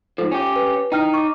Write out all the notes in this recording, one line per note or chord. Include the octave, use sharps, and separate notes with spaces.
G#2 F3 A4
C#4 G4
B4
D#4 E4 G5 F6
C#6 D6